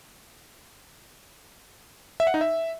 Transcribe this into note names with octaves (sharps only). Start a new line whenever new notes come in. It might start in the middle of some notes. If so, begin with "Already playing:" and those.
E5
F#5
D#4
E5